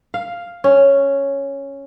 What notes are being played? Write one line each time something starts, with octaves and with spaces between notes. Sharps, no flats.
F5
C#4